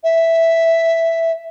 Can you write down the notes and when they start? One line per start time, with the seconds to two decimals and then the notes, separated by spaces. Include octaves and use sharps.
0.03 E5